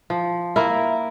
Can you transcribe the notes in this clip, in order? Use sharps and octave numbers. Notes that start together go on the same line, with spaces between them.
F3
A#3 E4 A#4